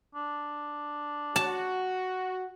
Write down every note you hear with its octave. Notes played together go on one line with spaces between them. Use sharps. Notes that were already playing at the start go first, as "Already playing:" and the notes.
D4
F#4 A5